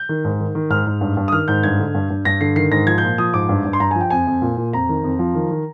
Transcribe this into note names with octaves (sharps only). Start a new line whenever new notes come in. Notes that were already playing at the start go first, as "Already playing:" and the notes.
Already playing: G6
D#3
G#2
D#3
D#3
G#2 F6
G#2
G2
G2
D#6
D#3 F6
G#2 G6
G2 G#6
D3
G2
G2
G2 A#6
D3 C7
D#3 C7
G#2 A#6
F3 G#6
G6
A#2
F3 D#6
G#2 D6
G2
G2
C6
G2 A#5
F3 G#5
G5
F2 G#5
F2
A#2
A#2
F2 A#5
D#3
F2
F3
D#3
D#3